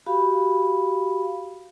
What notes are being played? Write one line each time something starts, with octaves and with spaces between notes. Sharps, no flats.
F#4 G4 F5 B5